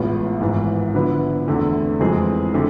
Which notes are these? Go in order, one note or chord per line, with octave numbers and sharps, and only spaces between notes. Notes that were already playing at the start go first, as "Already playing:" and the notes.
Already playing: A1 A2 G#3 B3 F4
G#1 G#2 E3
D3 F3 B3 E4 B4
E2 D3 A3 C4
F2 E3 G#3 C4 G#4
D3 A3 C4